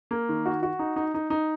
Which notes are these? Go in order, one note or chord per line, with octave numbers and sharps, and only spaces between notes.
A#3
D#3
F#4
F#4
D#4
D#4
D#4
D#4